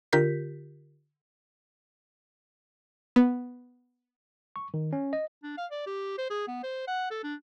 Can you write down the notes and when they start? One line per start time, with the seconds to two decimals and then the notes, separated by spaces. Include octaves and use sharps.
0.13 D3 F4 G4 A#4 G6 B6
3.16 B3
4.56 C#6
4.74 D#3
4.93 C#4
5.13 D#5
5.43 D4
5.58 F5
5.71 D5
5.86 G4
6.18 C5
6.30 G#4
6.48 B3
6.63 C5
6.88 F#5
7.10 A4
7.23 D4